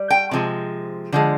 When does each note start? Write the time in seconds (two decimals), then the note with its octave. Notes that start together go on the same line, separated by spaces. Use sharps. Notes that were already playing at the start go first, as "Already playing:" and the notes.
Already playing: G3
0.10 G5
0.31 C3 F3 G#3
1.12 D3 F3 G#3